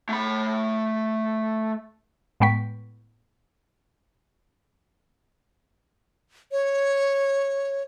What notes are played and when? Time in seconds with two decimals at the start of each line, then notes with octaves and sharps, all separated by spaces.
0.09 A3 B5
2.40 A2 G#3 B3 G5 C#6 B6
6.52 C#5